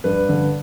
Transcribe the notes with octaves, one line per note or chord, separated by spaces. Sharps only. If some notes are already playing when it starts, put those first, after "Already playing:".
G2 B4
D3